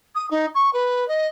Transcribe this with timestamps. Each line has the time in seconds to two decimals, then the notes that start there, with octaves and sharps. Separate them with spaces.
0.15 D#6
0.30 D#4
0.55 C#6
0.73 B4
1.08 D#5